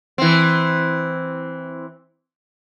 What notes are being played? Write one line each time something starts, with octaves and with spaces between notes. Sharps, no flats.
E3 C4